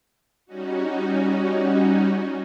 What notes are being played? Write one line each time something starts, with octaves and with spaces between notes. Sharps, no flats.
G3 C#4 D#4 F#4